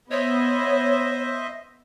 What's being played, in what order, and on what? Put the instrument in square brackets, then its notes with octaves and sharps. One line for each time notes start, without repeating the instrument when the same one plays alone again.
[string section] B3 [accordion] C5 D#5 E5 [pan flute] C#5